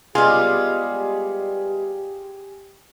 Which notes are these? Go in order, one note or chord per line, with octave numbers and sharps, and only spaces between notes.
G3 G#3 B3 F4 G4 G#4